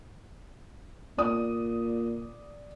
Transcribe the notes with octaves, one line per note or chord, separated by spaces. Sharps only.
A#2 D5 D#6